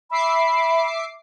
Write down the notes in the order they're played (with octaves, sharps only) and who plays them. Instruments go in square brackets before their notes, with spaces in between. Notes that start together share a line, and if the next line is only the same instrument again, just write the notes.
[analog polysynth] E5 D6 C7 [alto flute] B5